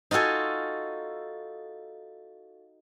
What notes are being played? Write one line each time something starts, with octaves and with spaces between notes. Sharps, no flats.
D#4 F4 F#4 A4 G#5